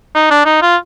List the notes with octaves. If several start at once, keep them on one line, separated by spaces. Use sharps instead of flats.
D#4
D4
D#4
F4